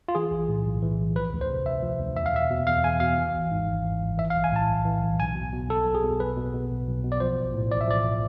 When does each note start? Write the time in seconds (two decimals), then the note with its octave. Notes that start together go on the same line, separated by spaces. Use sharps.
0.08 F4
0.15 E3 G#4
0.31 B1
0.49 A2
0.65 B1
0.82 E3
0.99 B1
1.16 F3 B4
1.33 D2
1.41 C5
1.50 C3
1.66 D2 E5
1.82 F3
2.00 D2
2.16 E2 E5
2.26 F5
2.34 B2 E5
2.50 B2
2.67 E2 F5
2.83 E2 G#5
3.00 B2 F5
3.18 E3
3.35 G#1
3.51 G#2
3.67 G#1
3.85 E3
4.02 G#1
4.18 E3 E5
4.30 F5
4.35 B1
4.44 G#5
4.52 A2 A5
4.69 B1
4.85 E3
5.02 B1
5.20 B1 G#5
5.35 B2
5.53 B2
5.70 B1 A4
5.86 B1
5.95 G#4
6.03 B2
6.20 B1 B4
6.37 B2
6.54 B2
6.71 B1
6.87 B1
7.04 B2
7.12 D5
7.20 F3 C5
7.38 A1
7.54 A2
7.72 A1 D5
7.81 E5
7.88 F3 D5